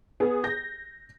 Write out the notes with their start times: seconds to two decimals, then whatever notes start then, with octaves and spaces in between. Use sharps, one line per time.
0.20 B3 G#4
0.44 G6 A#6